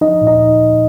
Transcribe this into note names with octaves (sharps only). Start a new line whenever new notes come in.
F3 D#4 D#5
A#2
D#4 D#5